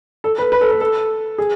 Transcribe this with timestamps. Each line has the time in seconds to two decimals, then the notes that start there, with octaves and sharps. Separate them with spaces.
0.24 A4
0.38 B4
0.52 B4
0.61 A4
0.71 B4
0.81 A4
1.38 G#4